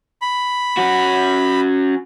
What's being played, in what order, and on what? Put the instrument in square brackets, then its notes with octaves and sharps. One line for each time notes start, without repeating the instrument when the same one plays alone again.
[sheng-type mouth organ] B5
[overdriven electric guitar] C#4 F#4